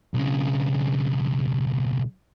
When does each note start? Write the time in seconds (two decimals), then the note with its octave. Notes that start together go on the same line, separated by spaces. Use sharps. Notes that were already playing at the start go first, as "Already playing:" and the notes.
0.14 B1 C#3